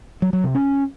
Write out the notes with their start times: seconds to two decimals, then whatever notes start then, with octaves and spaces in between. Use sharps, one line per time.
0.22 F#3
0.33 F#3
0.44 C3
0.55 C#4